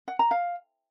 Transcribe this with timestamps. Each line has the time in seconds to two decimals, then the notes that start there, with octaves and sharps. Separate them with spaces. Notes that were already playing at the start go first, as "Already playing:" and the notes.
0.08 F#5
0.19 A#5
0.31 F5